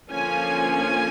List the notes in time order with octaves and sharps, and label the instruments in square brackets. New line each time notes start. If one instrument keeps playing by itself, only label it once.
[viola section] D3 F3 A#3 C#4 G#5